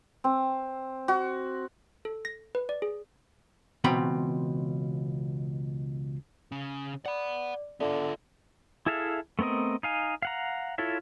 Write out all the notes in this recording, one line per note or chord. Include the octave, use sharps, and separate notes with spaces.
C4
F#4
A4
A#6
B4
D5
G#4
C#2 B2 E3 C4 A#5 B5
C#3 C#4
D5 F#5 B5
D3 B3 F4 D5 E5
E4 G#4 A4 E5 F5
A3 B3 C4 A#4 D#5
D#4 F5 G#5
F5 F#5 A#5
E4 F4 A4 C#5 E5